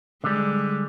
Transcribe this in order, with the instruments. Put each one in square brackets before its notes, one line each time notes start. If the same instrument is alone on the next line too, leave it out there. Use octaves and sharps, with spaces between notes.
[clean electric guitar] D3 G3 [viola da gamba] G#3